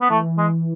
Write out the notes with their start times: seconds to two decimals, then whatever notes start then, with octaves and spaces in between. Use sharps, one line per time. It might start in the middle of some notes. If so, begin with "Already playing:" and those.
0.01 B3
0.10 E3 A3
0.38 G#3